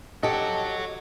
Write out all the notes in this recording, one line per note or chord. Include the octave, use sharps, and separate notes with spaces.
F#4 G4 A4 C#5 D#5